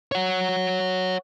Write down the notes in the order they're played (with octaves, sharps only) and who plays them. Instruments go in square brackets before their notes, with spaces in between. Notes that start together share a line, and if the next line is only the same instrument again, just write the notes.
[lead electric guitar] C#5 F#5